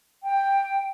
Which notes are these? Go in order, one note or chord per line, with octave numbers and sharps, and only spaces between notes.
G5